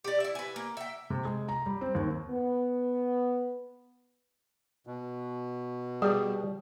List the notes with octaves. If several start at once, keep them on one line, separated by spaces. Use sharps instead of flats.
G4 D5
E4 E5
B4 G#5
A#3
E5 G5
C3
G#3
A#5
G3
C4
D#2
B3
B2
G3 G#4